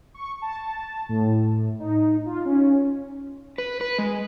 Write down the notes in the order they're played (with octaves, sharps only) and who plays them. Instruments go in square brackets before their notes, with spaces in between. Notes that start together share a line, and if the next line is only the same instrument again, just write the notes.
[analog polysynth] C#6
A5
A2
D#4
F4
C#4
[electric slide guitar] B4
B4
G#3